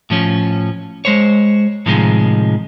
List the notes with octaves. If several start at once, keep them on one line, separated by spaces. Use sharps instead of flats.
A2 F3 C#4
G#3 C5 C#5
A2 C3 D#3 F3 G#3